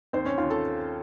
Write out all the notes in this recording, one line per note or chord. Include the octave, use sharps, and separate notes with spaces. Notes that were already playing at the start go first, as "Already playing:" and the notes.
D#2 C4 C5
C#4 C#5
D#2 F4 F5
A4 A5